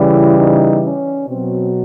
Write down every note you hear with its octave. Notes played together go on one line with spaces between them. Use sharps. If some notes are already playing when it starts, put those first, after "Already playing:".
Already playing: C#3 E3 G3 E4
D#4
C#4
B2 F#3 C4